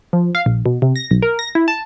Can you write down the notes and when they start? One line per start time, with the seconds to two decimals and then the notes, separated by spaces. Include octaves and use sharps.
0.13 F3
0.35 F5
0.46 A#1
0.66 B2
0.82 C3
0.96 A#6
1.11 B1
1.22 A#4
1.39 A#6
1.55 E4
1.68 A5